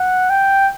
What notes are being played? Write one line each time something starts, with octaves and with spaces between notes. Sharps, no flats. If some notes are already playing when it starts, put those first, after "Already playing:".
Already playing: F#5
G5